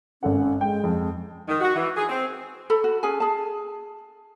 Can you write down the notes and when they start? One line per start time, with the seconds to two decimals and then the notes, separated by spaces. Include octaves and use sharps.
0.23 G#1 C#4 A4 F#5
0.61 G#3 G5
0.84 F2
1.48 D#3
1.60 F#4
1.76 E3
1.97 G#4
2.09 C4
2.70 A4 B5
2.84 F#4
3.03 C#4 G#4 A4 G#5
3.20 G#4 A5